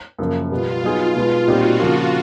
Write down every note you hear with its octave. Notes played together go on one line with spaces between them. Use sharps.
F#2 C#3 F3 A#3
B2 G3 B3 F4
F#3 B3 D#4 F4 G#4
B2 G#3 B3
A#2 G3 C4 D#4 F#4 G4
C#3 F3 A#3